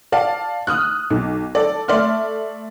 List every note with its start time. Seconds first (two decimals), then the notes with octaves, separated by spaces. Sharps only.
0.12 D5 F5 A5
0.67 D#6 F6 F#6
1.10 B1
1.55 A4 D5
1.88 A3 D5 E5 C6 F6